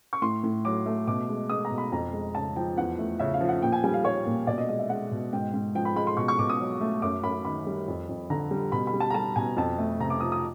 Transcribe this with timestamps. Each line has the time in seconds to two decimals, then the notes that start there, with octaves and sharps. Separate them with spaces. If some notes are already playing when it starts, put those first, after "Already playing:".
0.13 C#6
0.22 A2 C6
0.44 A2
0.65 F#3 D6
0.86 A3
1.07 B2 D6
1.29 G#3
1.50 G#3 D#6
1.65 A#5
1.71 B2
1.78 B5
1.92 F2 A#5
2.13 G#3
2.35 C#3 A5
2.56 F3 G5
2.77 E2 F#5
2.99 A3
3.19 C#3 E5
3.34 F5
3.41 F3
3.49 F#5
3.62 A#2 G5
3.72 G#5
3.84 G3 G#5
3.94 F5
4.04 G3 C#5
4.27 A#2
4.47 B2 D5
4.58 D#5
4.69 G#3 D#5
4.79 E5
4.89 G#3 F#5
5.11 B2
5.33 G#2 G5
5.54 G#2
5.75 F3 G5
5.85 B5
5.96 G#3 B5
6.07 C6
6.17 B2 C#6
6.28 C#6
6.39 B2 D6
6.49 D#6
6.61 F#3
6.81 A3
7.02 F#2 D6
7.23 F#2 B5
7.45 D#3 B5
7.67 G3
7.88 F2
8.09 F2
8.30 D3 A#5
8.51 G3
8.72 B2 B5
8.87 B5
8.94 G3
9.00 A5
9.10 A#5
9.14 G3 A5
9.36 B2 G#5
9.57 F2 A5
9.78 A3
10.00 C3 A#5
10.10 D6
10.21 F3 D#6
10.32 D#6